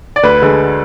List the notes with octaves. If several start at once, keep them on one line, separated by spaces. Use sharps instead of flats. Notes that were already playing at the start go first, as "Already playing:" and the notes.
D5
D2 B4
D3 G#3